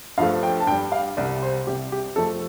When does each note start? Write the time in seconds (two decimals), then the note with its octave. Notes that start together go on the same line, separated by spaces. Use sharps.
0.18 G2 F3 A3 F5
0.43 G5
0.60 A5
0.67 G2 G5
0.72 G3
0.92 F5
1.17 C2 C3 G3 D5
1.42 C5
1.67 C2 C3 G3 G4
1.92 G4
2.16 F2 F3 A3 A4